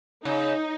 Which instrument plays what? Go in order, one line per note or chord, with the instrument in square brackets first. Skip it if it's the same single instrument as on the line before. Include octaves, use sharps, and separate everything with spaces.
[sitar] C#3 [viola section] D#4